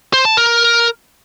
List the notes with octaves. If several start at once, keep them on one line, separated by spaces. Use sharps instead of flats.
C5
A5
A#4